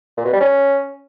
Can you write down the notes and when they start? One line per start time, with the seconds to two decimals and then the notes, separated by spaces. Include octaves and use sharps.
0.17 A#2
0.25 B2
0.33 G3
0.41 C#4